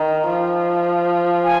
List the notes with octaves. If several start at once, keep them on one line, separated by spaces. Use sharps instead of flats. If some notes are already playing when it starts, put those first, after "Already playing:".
Already playing: D#3
F3
G#5